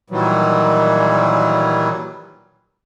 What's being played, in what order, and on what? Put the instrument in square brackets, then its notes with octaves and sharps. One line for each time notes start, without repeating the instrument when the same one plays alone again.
[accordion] A#2 D#3 E3 F#3 G3